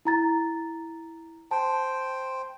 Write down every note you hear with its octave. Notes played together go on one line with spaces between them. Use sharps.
E4 A#5 A6
C5 G5 A5